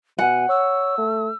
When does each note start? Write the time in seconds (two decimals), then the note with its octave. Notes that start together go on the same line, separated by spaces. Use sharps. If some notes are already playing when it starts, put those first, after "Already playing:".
0.19 B2 F#5 G#5
0.49 C#5 E6
0.98 A3